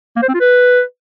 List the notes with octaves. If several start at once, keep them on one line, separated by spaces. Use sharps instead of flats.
A#3
C5
C4
F4
B4